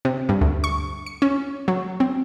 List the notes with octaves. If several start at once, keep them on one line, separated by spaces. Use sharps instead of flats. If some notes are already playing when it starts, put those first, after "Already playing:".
C3
G2
D2
C#6
C#7
C#4
F#3
C4